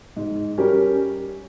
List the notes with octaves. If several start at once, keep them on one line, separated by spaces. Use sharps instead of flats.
G#2
G3 C#4 G4 A#4